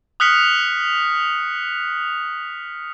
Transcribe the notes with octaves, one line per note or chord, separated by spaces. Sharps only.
D#6 F6 F#6 B6 C#7 F7